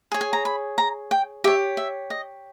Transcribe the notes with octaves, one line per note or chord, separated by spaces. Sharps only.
G#4 C#5
G#5
A#5
B5
A#5
G5
G4 C#5 E5
E5
D#5